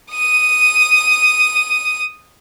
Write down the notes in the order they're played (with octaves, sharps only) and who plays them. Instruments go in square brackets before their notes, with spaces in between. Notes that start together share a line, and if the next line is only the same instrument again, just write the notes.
[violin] D#6 D#7